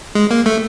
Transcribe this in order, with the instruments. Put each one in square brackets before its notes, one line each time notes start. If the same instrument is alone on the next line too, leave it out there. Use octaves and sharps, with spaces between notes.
[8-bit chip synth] G#3
A#3
A3